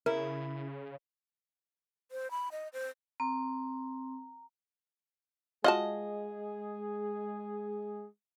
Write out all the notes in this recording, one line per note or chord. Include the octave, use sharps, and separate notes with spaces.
C#3 E4 A#4
C5
B5
D#5
C5
C4 A#5
G#3 F4 F#4 G#4 D#5 A5